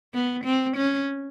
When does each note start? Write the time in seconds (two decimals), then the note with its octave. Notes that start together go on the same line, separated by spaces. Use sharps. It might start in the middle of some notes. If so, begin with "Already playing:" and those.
0.14 B3
0.44 C4
0.77 C#4